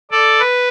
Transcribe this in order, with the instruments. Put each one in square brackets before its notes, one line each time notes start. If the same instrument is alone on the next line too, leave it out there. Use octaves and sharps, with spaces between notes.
[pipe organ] A4 D5
B4